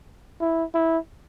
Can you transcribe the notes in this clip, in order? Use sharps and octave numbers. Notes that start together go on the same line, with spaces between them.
E4
E4